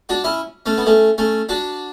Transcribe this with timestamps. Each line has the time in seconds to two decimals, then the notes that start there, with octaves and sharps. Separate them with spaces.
0.09 D4 F#4
0.24 C#4 E4
0.66 A3 C#4
0.78 B3
0.86 A3 C#4
1.18 A3 C#4
1.49 D4 F#4